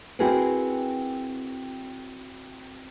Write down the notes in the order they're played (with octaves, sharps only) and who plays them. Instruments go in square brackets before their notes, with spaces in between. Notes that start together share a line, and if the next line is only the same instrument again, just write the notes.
[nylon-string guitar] C4 E4 F#4 G#4 A#4 B4